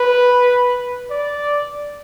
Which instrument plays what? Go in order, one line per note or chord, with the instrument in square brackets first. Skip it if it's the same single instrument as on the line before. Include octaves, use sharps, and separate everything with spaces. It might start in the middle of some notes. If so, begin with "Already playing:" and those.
Already playing: [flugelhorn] B4
D5